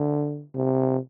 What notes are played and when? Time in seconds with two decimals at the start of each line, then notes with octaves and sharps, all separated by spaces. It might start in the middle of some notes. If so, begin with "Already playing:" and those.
Already playing: D3
0.55 C3